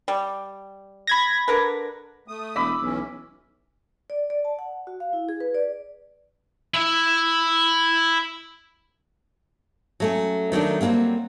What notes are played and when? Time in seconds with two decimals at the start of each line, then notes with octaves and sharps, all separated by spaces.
0.08 G3
1.07 B5 G#6 A#6
1.48 D3 A#4 B4
2.28 A3 D#6
2.56 E1 B5 D6 E6
2.82 B1 E3 C#4
4.10 D5
4.30 D5
4.45 A5
4.59 F#5
4.87 F#4
5.00 F5
5.13 E4
5.29 G#4
5.40 B4
5.55 D5
6.74 E4 E5
10.00 F#3 A3 C#4
10.52 D#3 F#3 A3 D4
10.81 F#3 G3 A3 A#3 C4